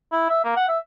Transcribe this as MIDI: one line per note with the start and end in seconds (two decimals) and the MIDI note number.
0.12 0.25 64
0.29 0.39 76
0.44 0.53 58
0.57 0.68 78
0.69 0.79 76